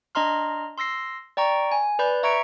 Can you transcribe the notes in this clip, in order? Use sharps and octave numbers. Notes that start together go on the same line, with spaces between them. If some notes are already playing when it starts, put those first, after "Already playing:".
D4 D#5 A#5 C6 F6
C6 E6 A#6 C7
D5 G5 A#5 C#6
G#5
B4 D5 B5 G6
E5 A#5 C#6 G#6 C#7 D7